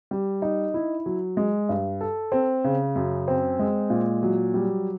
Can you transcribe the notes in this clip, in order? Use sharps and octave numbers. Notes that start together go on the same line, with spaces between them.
G3
D#4
E4
F#3
G#3
G2
A4
C4
C#3
F#2
C4
G#3
A#2
F#3
G3